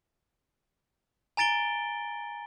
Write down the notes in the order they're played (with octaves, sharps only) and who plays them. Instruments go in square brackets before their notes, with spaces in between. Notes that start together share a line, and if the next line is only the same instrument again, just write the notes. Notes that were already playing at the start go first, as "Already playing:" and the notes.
[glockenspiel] G#5 A#5 A6 D7 G7